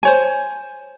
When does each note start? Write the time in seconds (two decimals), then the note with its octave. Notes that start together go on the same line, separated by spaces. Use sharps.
0.03 C5 C#5 G#5